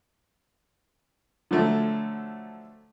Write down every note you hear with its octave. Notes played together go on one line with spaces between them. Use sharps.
D3 F3 F#3 A3